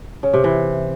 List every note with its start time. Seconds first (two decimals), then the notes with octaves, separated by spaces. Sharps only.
0.23 C#3
0.34 C3
0.44 E3